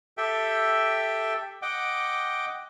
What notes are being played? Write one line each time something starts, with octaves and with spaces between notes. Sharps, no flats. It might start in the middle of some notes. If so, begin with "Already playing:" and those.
G4 A4 E5 G5
D#5 F#5 G5 D6